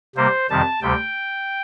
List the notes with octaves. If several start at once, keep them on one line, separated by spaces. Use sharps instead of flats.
C3 G3 A#3 C5
F2 C3 D#3 G3 A5
D2 C3 G3 G5